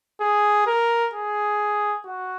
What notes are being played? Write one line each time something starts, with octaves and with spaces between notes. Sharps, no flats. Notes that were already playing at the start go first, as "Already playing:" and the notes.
G#4
A#4
G#4
F#4